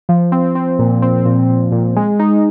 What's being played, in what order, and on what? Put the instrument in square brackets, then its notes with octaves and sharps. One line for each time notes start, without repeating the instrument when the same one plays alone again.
[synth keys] F3
C4
C4
A#2
C4
A#2
A#2
A#2
G#3
D#4